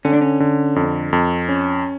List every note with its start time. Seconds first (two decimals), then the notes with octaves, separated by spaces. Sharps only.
0.05 D3 C#4
0.13 D4
0.21 C#4
0.40 D3
0.76 F2
1.13 F2
1.49 C#4